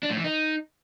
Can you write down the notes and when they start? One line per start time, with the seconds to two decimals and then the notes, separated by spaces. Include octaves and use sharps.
0.03 D4
0.10 A2
0.17 E3
0.24 D#4